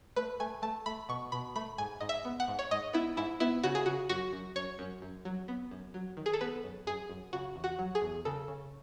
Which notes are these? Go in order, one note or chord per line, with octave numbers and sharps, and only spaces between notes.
A3 B4
A3 G#5
A3 A5
A3 B5
B2 C#6
B2 B5
A3 B5
G#2 G#5
G#2 D#5
E5
B3
F#5
G#2
C#5
G#2 D#5
B3 E4
G#2 E4
B3 E4
C#3 F#4
G#4
C#3 F#4
F#2 F#4
F#2
F#2 C#5
F#2
F#2
F#3
B3
F#2
F#3
D#3
G#4
A4
B3 B4
F#2
F#2 G#4
F#2
C#3 F#4
E2
F#4
F#3
G#4
E2
C#3 A4
C#3